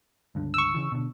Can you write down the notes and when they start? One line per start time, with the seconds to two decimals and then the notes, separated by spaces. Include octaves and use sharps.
0.35 C#2 G2 D3
0.54 C#6 E6
0.74 C#3 E3
0.92 B2 D3